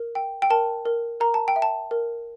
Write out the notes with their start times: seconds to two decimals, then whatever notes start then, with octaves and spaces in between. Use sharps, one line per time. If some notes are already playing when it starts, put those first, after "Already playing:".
Already playing: A#4
0.15 G5
0.42 G5
0.50 A#4 A5
0.86 A#4
1.20 A#4 A#5
1.34 A5
1.48 G5
1.56 E5
1.62 A5
1.91 A#4